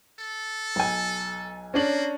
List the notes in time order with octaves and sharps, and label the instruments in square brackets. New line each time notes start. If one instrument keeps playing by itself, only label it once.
[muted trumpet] A4
[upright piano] B1 G#5
[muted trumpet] A#3 [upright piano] C#4 D4 F#7